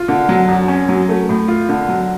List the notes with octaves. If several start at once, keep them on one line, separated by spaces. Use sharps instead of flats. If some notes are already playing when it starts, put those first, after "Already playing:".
Already playing: F4
D3
F#3
F#2
C#4
F#3
A3
A2
F4
D3
F#3